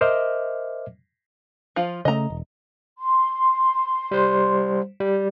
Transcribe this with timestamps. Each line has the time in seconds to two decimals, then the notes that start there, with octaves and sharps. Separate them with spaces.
0.01 A#4 C5 D#5 E5 D6 F6
1.76 F3 F4
2.05 C#3 A3 D#5 A#5
2.30 E1
2.98 C6
4.11 G3 C5
5.00 G3